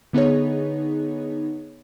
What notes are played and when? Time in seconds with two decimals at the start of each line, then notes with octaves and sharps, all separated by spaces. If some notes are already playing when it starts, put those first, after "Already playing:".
0.13 D3 B3 D#4 G#4 C#5